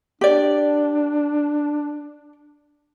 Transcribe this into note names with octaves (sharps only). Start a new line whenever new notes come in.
D4 G4 D5